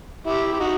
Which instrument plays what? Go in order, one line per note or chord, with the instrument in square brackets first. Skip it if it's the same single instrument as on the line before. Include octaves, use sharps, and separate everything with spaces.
[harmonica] E4 G4
G4
D#4 F#4